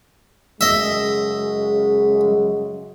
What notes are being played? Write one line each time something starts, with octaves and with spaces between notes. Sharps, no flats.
F#2 C#3 G#3 D#5 E5